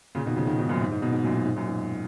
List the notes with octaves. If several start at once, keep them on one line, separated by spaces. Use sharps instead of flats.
A#2 C#3
B2 D#3
C#3 F3
B2 D#3
G#2 B2
F#2 A#2
G#2
G#2
G#2 B2
G#2
F#2 A#2
G#2
G#2
F#2 A#2
G#2